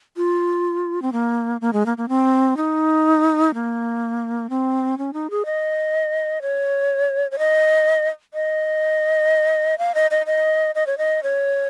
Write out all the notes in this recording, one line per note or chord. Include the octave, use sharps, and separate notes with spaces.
F4
C4
A#3
A#3
G#3
A#3
A#3
C4
D#4
A#3
C4
C#4
D#4
G#4
D#5
C#5
C#5
D#5
D#5
F5
D#5
D#5
D#5
D#5
C#5
D#5
C#5